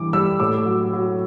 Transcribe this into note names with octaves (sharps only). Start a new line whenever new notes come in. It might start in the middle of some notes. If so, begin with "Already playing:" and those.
Already playing: E3 G3 D6
G3 E6
A2 D6
F#3
F#3